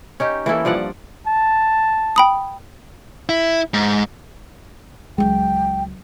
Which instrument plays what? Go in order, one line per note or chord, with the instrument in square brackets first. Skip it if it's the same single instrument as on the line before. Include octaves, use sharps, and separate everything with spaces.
[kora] C#4 D#4 G4
E3 A#3 E4 A4
G2 F3 D5 F#5
[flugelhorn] A5
[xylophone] G5 B5 D#6
[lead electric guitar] E4
G#2
[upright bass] C#2 F#3 [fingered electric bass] G#3 [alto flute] G5